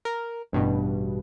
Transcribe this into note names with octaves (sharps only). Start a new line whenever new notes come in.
A#4
A1 G2 B2